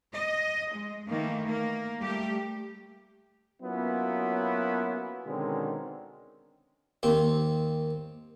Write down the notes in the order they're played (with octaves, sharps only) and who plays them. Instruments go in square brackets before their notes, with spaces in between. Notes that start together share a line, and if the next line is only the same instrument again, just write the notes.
[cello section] D#5
G#3
D#3 E3 A3 A#3
A#3
G3 A3 G4
[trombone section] F#3 A#3 B3 C#4 E4 F4
B2 D3 D#3 G#3 C4 C#4
[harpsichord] D#2 C4